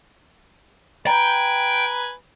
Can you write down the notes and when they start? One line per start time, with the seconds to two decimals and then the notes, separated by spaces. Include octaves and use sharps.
1.07 B4 G5 G#5 A#5